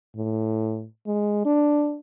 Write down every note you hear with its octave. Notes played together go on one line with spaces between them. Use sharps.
A2
G#3
D4